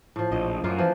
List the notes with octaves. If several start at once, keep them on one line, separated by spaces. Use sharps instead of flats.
A2 F3
A#1 D#5
F#2 A#3 F4
E3 F3